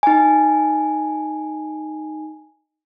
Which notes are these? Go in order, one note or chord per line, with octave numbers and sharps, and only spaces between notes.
D#4 G#5